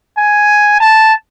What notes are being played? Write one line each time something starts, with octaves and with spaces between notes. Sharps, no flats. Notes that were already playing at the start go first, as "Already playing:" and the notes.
G#5
A5